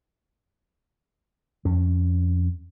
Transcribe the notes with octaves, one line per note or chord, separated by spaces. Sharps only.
F2 C#4